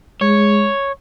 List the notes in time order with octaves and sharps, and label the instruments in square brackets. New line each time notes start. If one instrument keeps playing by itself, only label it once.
[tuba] G#3 [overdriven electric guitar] C#5